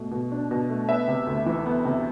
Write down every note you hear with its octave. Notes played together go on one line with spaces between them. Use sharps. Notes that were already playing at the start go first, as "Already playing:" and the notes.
Already playing: B2 A3
B2
D4
B2
A3
B3 E5
C3
D2
E3
B3
C3